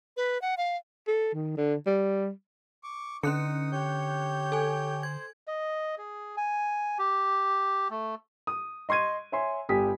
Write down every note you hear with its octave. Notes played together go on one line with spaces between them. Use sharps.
B4
F#5
F5
A4
D#3
D3
G3
C#6 D6
D3 C#4 D#4 D#6 F#6 C#7
G4 C#5 G6
A4 G#5
C5 G#6
D#5
G#4
G#5
G4
A3
D#6
D#5 C6 C#6 G#6 D#7
C#5 E5 G#5 C6
G1 G3 G4 G#5 D#6 B6